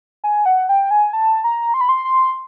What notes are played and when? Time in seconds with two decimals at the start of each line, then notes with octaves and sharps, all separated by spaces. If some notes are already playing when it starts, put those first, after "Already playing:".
0.24 G#5
0.46 F#5
0.69 G5
0.91 G#5
1.13 A5
1.44 A#5
1.74 C6
1.81 B5
1.89 C6
2.05 C6